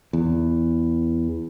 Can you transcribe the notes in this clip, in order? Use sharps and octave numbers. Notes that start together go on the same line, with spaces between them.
E2